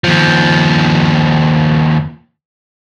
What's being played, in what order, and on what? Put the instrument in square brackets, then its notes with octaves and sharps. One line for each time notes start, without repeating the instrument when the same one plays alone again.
[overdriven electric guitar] D#2 F3